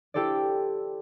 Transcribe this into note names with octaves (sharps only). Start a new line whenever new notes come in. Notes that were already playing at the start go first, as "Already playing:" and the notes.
E4 G4 A4 C5 D5